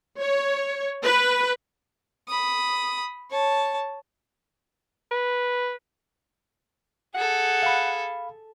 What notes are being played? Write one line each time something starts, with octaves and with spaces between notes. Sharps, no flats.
C#5
B4
B5 D#6
C#5 A5
B4
G#4 A4 F#5
F5 B5